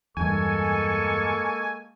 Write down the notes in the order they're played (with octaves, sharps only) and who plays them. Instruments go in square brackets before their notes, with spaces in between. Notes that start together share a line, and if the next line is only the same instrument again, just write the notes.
[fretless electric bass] E2 G2 [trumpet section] G#3 A#3 C#6 [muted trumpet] A4 [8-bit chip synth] G#5